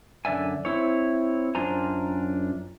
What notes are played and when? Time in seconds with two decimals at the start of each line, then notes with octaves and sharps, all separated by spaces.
0.25 F#2 D3 D5 E5 G#5
0.65 C4 E4 C#5
1.55 F#2 D4 F4 C5 G#5 A#5